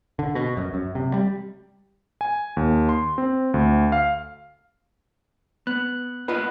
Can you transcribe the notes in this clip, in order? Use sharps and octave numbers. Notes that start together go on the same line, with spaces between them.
D3
B2
F#2
F#2
C3
G3
G#5
D#2
C6
C4
D2
F5
B3 F#6
B3 F4 B4 D#5